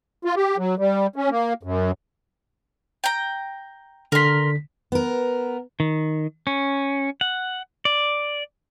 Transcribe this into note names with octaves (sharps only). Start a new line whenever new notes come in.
F4
G4
F#3
G3
C#4
A#3
F#2
G5 A#5
D3 A#4 C6 B6
B3 A#4
D#3
C#4
F#5
D5